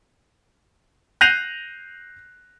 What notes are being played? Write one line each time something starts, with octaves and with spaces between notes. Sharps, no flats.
F#6 G6 A#6 C7 D#7 F7